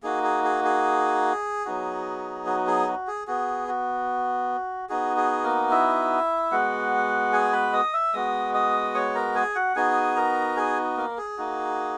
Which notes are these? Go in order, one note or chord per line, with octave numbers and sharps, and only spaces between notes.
A#3 D#4 F#4 G#4
G#4
G#4
G#4
F#3 B3 D#4 F#4
F#4
G#4
F#4
G#4
B3 F#4 G#4
F#4
B3 D#4 F#4 G#4
G#4
A#3 A#4
E4 E5
G#3 B3 F#4 F#5
G#4 G#5
B4 B5
D#5 D#6
E5 E6
G#3 B3 F#4 D#5 D#6
D#5 D#6
C#5 C#6
A#4 A#5
G#4 G#5
F#4 F#5
B3 D#4 F#4 G#4 G#5
A#4 A#5
G#4 G#5
A#3 A#4
G#4
A#3 D#4 F#4